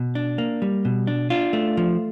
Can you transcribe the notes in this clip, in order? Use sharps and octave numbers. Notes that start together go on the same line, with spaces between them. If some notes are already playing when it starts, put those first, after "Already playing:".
Already playing: B2
D4
A#3
G3
B2
D4
D4 F4
A3
F3